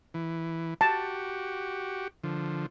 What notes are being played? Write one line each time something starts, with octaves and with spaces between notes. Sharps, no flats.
E3
F#4 G4 A5
D3 F3